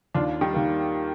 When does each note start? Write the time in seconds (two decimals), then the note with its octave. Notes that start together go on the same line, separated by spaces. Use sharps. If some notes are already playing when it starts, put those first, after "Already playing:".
0.14 D#2 D4 F4
0.41 D#3 G3
0.54 D#3 A#3